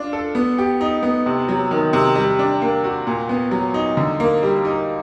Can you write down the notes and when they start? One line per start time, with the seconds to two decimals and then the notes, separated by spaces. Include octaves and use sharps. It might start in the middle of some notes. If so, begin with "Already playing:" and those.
Already playing: D4 F4
0.13 A4
0.35 B3
0.58 G4
0.81 D#4
1.03 B3
1.26 C3
1.49 F#3
1.71 D#3
1.93 C3
2.15 G3
2.39 D4
2.62 A#3
2.84 F#4
3.07 A#2
3.29 B3
3.51 F#3
3.74 D#4
3.97 D3
4.20 A#3
4.43 G3
4.65 D#4